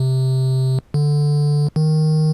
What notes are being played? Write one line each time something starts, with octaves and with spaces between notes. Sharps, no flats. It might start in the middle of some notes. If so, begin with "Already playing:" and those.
Already playing: C3
D3
D#3